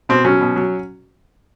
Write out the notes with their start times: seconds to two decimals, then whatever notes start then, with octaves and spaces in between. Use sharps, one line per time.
0.09 B2 C4
0.25 F#3 C#4
0.41 B2
0.56 F#3